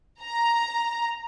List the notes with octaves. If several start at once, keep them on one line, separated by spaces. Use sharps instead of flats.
A#5